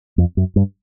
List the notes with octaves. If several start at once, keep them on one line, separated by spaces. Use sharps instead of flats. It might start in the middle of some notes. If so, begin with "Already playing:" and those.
F2
F#2
G2